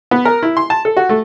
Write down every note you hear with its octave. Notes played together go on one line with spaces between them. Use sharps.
B3
A#4
E4
C6
A5
A4
F#4
A3